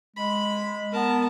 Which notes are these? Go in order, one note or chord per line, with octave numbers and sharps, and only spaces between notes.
G#3 B5
B3 A#4 A5